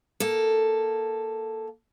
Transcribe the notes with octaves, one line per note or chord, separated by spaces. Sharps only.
A#3 A4